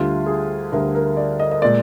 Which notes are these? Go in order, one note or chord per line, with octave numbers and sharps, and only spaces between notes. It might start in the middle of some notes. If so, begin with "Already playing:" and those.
Already playing: D2 D3 G3 F4
G#4
D2 D3 G3 A#4
A#4
D5
D#5
D#5
A#2 G#3 D5